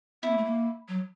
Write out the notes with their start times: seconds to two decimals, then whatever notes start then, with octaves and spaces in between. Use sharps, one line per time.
0.23 B3 E4
0.30 A#3
0.37 A3
0.45 A#3
0.88 F#3